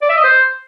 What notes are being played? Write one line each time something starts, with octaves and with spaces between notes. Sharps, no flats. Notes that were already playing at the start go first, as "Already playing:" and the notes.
D5
E5
D#5
C5